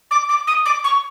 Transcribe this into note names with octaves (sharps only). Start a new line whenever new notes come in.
D6
D6
D#6
D6
C#6